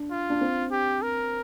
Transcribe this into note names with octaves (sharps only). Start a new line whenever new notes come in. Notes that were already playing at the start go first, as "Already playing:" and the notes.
Already playing: D4
F4
D4
C4
G4
A#4